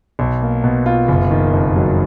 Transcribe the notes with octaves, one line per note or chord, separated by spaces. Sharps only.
B1
A#3
B2
F4
F#1
D#3
F2
F#3